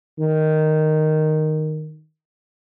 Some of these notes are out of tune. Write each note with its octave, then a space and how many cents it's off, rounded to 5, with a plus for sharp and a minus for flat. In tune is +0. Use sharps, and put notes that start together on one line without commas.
D#3 -5